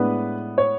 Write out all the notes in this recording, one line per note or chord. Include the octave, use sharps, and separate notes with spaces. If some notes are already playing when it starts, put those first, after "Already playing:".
Already playing: A2 G#3 B3 D4 B4
C#5